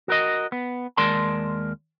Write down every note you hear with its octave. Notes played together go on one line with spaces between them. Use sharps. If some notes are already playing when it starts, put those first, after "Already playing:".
F#4 A#4 D#5
B3
D#2 G#3 A#4 D5 A5 C6